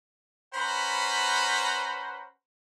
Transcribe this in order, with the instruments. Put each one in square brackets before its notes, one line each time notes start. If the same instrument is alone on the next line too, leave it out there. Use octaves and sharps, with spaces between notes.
[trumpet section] C#4 B4 C5 F#5 A#5 B5